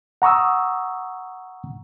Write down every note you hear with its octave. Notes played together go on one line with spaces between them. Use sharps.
F#5 A#5 C#6 D#6 E6